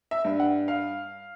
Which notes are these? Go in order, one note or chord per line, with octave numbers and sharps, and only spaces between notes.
E5
G2
F#5
F5